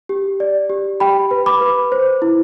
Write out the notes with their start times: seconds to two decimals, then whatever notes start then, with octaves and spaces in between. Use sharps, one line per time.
0.09 G4
0.40 D5
0.70 G4
1.00 G4 G5 B5
1.31 B4
1.46 B5 D6
1.61 B4
1.92 C5
2.22 E4